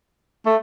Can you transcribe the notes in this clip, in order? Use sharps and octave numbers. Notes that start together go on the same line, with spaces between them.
A3